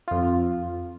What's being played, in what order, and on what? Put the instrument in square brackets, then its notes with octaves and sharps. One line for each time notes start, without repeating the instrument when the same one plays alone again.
[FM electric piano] F2 F4